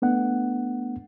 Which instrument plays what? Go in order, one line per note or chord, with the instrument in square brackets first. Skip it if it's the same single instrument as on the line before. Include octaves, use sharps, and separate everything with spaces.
[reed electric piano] A3 B3 D4 F#5